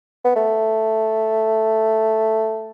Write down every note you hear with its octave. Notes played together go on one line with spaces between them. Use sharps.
B3
A3